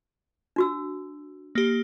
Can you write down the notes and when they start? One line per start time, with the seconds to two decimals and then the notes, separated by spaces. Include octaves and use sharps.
0.56 D4 F#4 E6
1.55 A#3 G4